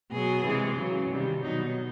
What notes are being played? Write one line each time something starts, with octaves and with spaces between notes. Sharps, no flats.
B2 F#3 G#4
C3 E3 G#3
C#3 F#3
C3 D#3 G3
B2 F#3 D#4